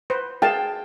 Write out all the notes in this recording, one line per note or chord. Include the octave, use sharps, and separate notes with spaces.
B4 C5
G#4 F5 G5 A5